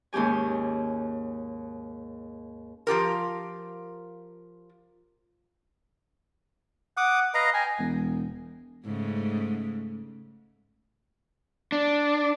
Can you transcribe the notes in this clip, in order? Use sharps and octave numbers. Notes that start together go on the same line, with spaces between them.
D#2 G#2 C#4 G4 G#5
F3 F4 G4 A#4
F#5 D6 D#6
B4 D#5 F5 A#5
G5 G#5
E1
G#2 C#3 A3
D4